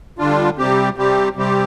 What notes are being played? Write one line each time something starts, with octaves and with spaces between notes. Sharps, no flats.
D3 G3 D4 F4
C3 G3 C4 G4
C3 G3 C4 G4
C3 G3 C4 G4